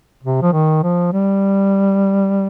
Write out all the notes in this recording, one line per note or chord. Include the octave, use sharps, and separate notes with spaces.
C3
F3
D#3
F3
G3